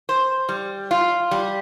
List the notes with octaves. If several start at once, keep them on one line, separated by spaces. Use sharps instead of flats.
C5
G3
F4
G3